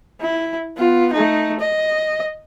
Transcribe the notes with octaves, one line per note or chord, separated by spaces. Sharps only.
E4
B3 F4
A3 D#4
D#5